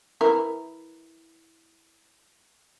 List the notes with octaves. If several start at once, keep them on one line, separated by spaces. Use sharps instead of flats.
E3 E4 A#4